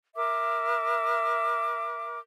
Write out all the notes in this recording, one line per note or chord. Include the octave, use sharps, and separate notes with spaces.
A#4 E5 D6